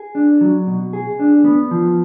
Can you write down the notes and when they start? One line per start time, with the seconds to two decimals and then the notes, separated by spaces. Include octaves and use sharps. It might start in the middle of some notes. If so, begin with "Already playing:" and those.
Already playing: G#4
0.15 D4
0.41 F#3
0.67 B2
0.93 G#4
1.19 D4
1.44 B3
1.71 F3